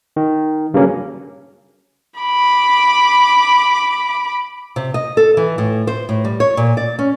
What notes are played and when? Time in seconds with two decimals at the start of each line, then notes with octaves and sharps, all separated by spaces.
0.16 D#3
0.74 G2 C#3 F#3 A#3 C#4
2.20 B5 D6
4.76 C3
4.94 D#5
5.17 A4
5.37 E3
5.58 A2
5.87 C5
6.09 A2
6.25 G3
6.40 C#5
6.57 A#2
6.77 D5
6.99 C#4